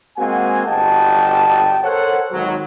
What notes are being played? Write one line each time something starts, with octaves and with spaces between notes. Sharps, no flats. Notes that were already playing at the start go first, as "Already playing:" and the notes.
G#3 A#3 C4 F#4 F#5 G#5
G1 F#4 D#5 G5 A5
A4 A#4 C5 C#5 F#5
G#1 F#3